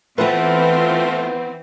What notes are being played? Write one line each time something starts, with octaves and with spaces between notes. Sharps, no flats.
E3 A3 B3 C4 F4 B4